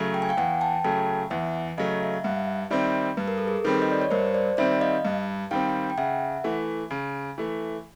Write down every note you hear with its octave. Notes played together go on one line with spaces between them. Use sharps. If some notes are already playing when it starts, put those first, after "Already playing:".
Already playing: C#3 F#3 A3
G5
G#5
F5 G5
E2 F#5 G#5
G5 A5
C#3 F#3 A3 G5 A5
E2 E5 F#5
C#3 F#3 A3 D#5 F5
E5
F5
G2 E5 F#5
D#3 G3 C4 D5 E5
G2 B4
A#4
A4
G#4 A#4
D#3 G3 C4 A4 B4
D#5
D5
C#5
G2 A#4 C5
C5 D5
D#3 G3 C4 D5 E5
D#5 F5
G2
D#3 G3 C4 F5 G5
G5
C#3 E5 F#5
E3 A3
C#3
E3 A3